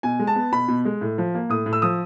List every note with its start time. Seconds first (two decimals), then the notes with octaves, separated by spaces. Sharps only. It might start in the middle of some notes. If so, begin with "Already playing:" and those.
0.03 B2 G#5
0.20 G#3
0.27 A5
0.36 B3
0.52 B2 B5
0.68 B2
0.85 G#3
1.01 A2
1.18 F3
1.34 A#3
1.50 A2 D#6
1.66 A2
1.73 E6
1.82 F3 D#6